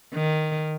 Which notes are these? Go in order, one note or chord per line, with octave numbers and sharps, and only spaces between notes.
D#3